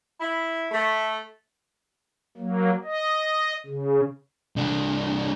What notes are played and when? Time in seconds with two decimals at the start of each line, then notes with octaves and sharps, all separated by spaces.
0.20 E4
0.71 A3
2.37 F#3 A#3
2.85 D#5
3.66 C#3
4.56 C2 D4